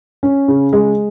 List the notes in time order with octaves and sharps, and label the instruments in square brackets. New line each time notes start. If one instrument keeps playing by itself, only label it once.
[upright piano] C#4
C#3
G#3